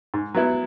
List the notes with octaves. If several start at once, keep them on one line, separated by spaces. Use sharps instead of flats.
G#2
F#3 B3 E4